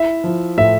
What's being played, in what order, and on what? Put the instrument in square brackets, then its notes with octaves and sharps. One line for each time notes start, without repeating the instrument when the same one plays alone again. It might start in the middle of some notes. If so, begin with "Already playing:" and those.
Already playing: [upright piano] E4 [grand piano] E5
[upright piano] F3
[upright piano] A2 [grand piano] E5